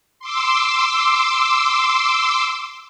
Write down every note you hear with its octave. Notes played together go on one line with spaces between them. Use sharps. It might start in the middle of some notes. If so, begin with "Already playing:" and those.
C6 D6 E6